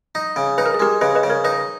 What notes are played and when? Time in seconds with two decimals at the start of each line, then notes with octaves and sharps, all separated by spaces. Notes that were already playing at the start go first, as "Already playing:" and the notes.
0.15 D#4
0.36 C#3
0.58 D#4 B4
0.66 A#4
0.74 G#4
0.80 G#3 G4 A#4
1.01 C#3 B4 D#5
1.15 B4 D#5
1.23 C#3
1.30 A#4 C#5
1.44 D#4 B4 D#5